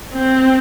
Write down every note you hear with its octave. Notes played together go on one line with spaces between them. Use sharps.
C4